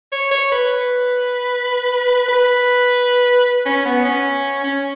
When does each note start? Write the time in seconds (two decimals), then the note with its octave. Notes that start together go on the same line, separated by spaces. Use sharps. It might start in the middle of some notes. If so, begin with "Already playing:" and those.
0.12 C#5
0.32 C#5
0.52 B4
2.28 B4
3.66 C#4
3.86 B3
4.05 C#4
4.64 C#4